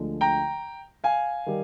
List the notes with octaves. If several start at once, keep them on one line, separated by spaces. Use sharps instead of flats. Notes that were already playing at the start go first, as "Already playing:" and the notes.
Already playing: D2 D3 F3 G#3
G5 A#5
F5 G#5
D#3 G3